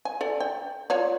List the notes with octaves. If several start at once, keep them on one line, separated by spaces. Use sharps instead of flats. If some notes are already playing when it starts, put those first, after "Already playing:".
G#5
A4 D5
G5
F4 C#5 D5